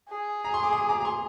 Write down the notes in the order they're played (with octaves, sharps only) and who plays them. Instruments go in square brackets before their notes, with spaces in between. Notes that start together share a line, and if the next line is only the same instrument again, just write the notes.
[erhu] G#4
[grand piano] A#5
C6
D6
C6 D#6
A#5 D6
A#5
G#5 C6